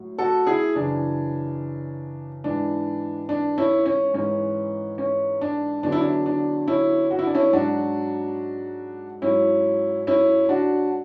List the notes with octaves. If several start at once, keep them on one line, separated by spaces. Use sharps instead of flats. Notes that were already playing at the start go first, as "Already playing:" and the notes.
Already playing: A2 F#3
F#4 A4
E4 G#4
F#2 C#3 E3 D4
G#2 E3 D4
D4
C#4 E4
C#4
G#2 E3 C#4
C#4
D4
E2 D3 F#3 D4
E4
D4
D4
C#4 E4
F#4
E4
D4
C#4 E4
G#2 F#3 D4 F#4
G#2 F#3 C#4 E4
C#4 E4
D4 F#4